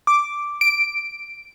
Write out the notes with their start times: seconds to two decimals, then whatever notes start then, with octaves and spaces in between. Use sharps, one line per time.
0.07 D6
0.61 D7